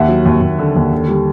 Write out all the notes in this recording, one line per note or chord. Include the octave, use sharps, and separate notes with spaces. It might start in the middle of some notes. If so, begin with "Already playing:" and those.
Already playing: D#2 E5 F#5
F#3
D#2
D#2
D3
D#2
D3
G3